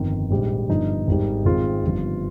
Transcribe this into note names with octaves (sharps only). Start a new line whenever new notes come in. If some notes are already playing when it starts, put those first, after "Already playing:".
Already playing: G1 F2 D#3
A#1 G#2 G3
G1 G2 F3 D#4
G#1 G#2 G3
G#1 G#2 D#3 G#3 C4 F4
G1 G2 F3